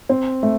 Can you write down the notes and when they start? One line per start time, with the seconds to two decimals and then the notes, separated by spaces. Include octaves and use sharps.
0.09 C4
0.43 A3